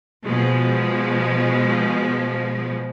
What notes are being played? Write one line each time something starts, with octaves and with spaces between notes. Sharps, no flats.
B2 F3 G#3